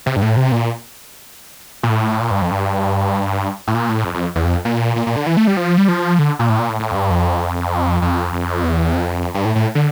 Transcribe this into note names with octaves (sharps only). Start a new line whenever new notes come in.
C3
G2
A2
C3
A#2
A#2
A2
A#2
G2
F2
G2
A2
A#2
A2
F2
F2
E2
F2
A#2
A#2
A#2
D3
E3
A3
G3
F3
G3
F3
D3
A#2
A2
A#2
A2
A2
F2
G2
F2
F2
F2
E2
F2
G2
A2
A2
D3